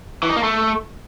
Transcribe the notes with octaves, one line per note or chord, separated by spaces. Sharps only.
E3
D#4
A#3
A3